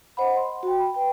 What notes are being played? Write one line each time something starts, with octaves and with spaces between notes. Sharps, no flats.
C5 D#5 F#5 B5
C6
F#4 G5
B5
B4 G5